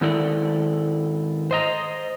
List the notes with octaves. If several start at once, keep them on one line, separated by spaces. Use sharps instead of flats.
G#2 D#3 E4 A4 D5
C5 D#5 A#5